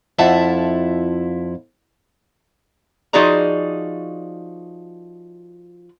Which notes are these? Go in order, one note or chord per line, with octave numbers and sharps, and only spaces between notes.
F2 E4 F4 E5 F#5 A5
F3 D#4 F#4 G#4 D5 A#5